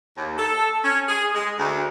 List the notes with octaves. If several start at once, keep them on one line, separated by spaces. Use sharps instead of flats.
D#2
A4
C#4
G#4
G#3
D2